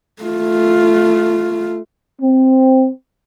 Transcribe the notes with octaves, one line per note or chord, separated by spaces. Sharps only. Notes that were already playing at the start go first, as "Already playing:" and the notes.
A3 F4
C4